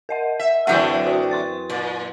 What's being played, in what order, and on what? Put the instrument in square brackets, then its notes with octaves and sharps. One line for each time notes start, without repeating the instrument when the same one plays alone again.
[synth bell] A#4 D#5 F#5
[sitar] E5
[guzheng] F#2 E3 C4 [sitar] D3 F#3 A3 [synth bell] F#5 D#6
[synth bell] F#4 D5 G5
C6 C#6 A6
[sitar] A#2 [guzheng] D5